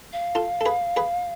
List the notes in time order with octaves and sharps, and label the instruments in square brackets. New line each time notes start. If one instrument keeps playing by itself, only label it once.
[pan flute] F5
[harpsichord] F4 A4
A4
G#4 B4
G#4 B4